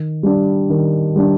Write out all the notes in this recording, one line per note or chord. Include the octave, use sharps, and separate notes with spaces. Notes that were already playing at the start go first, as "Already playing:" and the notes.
Already playing: D#3
G3 D4
D#3
G3 D4